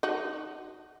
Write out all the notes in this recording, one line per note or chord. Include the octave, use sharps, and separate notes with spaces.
D#4 F#4